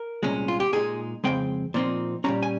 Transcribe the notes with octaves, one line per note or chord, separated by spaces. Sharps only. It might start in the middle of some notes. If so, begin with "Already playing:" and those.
Already playing: A#4
C2 A#2 G#3 C#4
F4
G4
A#2 G#3 D#4 G#4
F2 C#3 G#3 C4 G5
A#2 F3 C4 D#4
A#2 G3 C#4 A#5
G#5